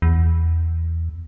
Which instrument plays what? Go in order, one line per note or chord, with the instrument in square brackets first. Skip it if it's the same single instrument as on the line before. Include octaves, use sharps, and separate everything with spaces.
[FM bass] E2